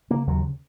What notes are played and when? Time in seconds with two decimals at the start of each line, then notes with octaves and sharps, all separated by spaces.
0.10 C#3 A#3
0.27 D#2 F#3